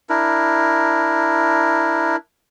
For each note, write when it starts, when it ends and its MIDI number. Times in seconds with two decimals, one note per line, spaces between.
0.09 2.16 62
0.09 2.16 64
0.09 2.16 70